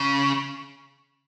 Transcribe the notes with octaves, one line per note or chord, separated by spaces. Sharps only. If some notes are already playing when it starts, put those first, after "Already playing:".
Already playing: C#3